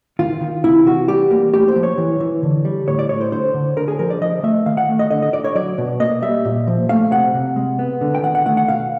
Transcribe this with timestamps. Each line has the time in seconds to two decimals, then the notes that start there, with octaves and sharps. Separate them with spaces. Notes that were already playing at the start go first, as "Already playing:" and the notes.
0.19 D#3 F4
0.41 D#3
0.64 C3 E4
0.86 E3 F#4
1.08 G3 G4
1.31 A#3
1.53 A3 G4
1.68 C5
1.76 F3
1.83 C#5
1.98 E3
2.20 E3
2.43 D3
2.65 G3
2.87 A2 C#5
2.99 D5
3.09 A2 C#5
3.21 C5
3.32 D3 C5
3.54 D3
3.77 D3 A#4
3.88 G#4
3.99 F3 A#4
4.10 D5
4.21 F3 D#5
4.43 A3 E5
4.66 D#3 F5
4.77 F#5
4.89 A3
4.99 D#5
5.11 D3 D#5
5.22 D#5
5.33 D3 D5
5.44 C#5
5.55 F#3 D5
5.78 B2
6.00 A#3 D#5
6.22 G3 E5
6.45 A#2
6.67 F3
6.89 A3 F5
7.12 C3 F#5
7.34 C3
7.56 G#3
7.79 B3
8.01 D3
8.15 G5
8.23 D#3 F#5
8.35 F#5
8.46 A3 F#5
8.57 F#5
8.68 B2 F5